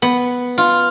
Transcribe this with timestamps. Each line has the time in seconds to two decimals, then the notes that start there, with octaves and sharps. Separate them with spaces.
0.02 B3
0.58 F4